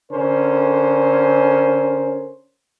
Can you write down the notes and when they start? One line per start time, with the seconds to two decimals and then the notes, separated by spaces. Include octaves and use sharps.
0.11 D3 C#4 A#4 C5